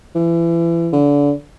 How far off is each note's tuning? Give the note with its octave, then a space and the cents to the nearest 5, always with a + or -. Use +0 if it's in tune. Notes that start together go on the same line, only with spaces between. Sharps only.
E3 +30
D3 -30